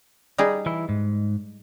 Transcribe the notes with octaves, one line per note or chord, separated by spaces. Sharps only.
G3 D#4 G#4
E3 E4
G#2